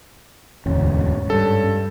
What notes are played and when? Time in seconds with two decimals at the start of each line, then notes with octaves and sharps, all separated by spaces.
0.66 E1 D2 G#2 C#4
1.30 G2 A4